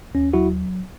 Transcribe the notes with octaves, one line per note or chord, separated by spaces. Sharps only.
D#2 C#4
F#3 E4 F#4